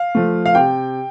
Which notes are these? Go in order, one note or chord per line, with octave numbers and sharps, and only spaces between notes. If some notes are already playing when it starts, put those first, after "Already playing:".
Already playing: F5
F3 A3
F5
C3 G5